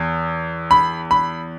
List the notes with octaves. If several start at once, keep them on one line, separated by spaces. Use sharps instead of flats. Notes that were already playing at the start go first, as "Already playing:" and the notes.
Already playing: E2
B5
B5